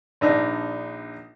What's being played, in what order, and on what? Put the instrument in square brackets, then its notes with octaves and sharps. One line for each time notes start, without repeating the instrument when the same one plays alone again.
[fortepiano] A#1 D4 D#4